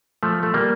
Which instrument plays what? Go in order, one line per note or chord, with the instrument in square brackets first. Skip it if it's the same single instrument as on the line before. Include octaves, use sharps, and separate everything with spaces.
[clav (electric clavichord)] F3 A3
A3
G3 A#3